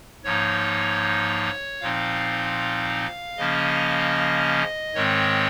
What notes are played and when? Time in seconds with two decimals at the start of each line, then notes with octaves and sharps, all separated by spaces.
0.24 G#2 F3 A#3 D#4 C#5
1.81 A#2 F3 C4 D#4 F5
3.37 C#3 F3 A#3 C#4 D#5
4.94 G#2 D#3 G#3 C4 C#5